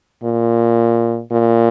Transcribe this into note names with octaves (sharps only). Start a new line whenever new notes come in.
A#2
A#2